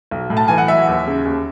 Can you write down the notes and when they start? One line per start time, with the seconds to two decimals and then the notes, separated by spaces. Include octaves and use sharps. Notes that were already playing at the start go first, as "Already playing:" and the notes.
0.11 B1
0.30 A2
0.37 A5
0.48 E3 G#5
0.58 F#5
0.68 F#3 E5
0.87 D#2
1.07 C#3
1.25 D#2